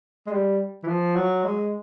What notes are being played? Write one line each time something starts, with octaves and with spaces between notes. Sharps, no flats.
G#3
G3
E3
F3
F#3
G#3